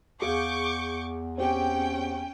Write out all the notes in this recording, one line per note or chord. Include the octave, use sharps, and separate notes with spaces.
E2 G#4 F5 C#6 D6 G6
C4 C#4 G4 G5